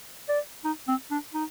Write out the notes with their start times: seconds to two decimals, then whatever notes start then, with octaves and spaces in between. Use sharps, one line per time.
0.29 D5
0.64 D#4
0.88 C4
1.11 D4
1.34 D#4